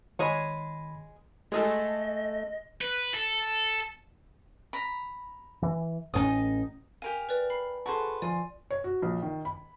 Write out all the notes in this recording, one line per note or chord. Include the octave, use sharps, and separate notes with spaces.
D#3 G#3 G#4 C#5 B5
G#3 A3 G#4 A4 D#5
B4
A4
A#5 B5
E3
A1 A2 C#4 D#4 F4 D#6
G4 A#4 F5 G#5
B4 D5
B5 C7
F#4 G#4 A4 B4 C5 A5 C#6
F3 D5 G#5 C6
C#5
F#4
A#1
D#3
B5